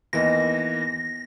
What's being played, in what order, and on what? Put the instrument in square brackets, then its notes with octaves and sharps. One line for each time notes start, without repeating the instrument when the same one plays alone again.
[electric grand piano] D#2 E3 A#4 [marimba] B3 D#5 [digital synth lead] A#6